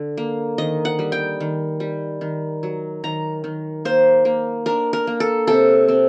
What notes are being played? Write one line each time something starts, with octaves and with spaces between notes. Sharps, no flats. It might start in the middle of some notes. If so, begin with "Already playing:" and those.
Already playing: D3
A#3
D#3 D#5
F#5
G3
G5
D#3
G3
D#3
F#3
D#3 A#5
D#3
A#3 C5
A#3
D4 A#4
A#4
A#3
A4
C3 A4
C4